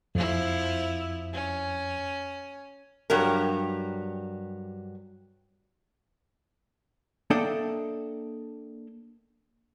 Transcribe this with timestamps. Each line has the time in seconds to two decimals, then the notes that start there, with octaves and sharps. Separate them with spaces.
0.15 F2 F3 E4
1.33 C#4
3.10 G2 F#3 G4 A#4
7.30 A#3 D4 A4 D#5 E5 G5